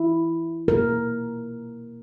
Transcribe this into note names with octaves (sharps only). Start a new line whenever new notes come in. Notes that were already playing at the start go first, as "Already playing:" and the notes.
Already playing: E4
B2 A#3 A#4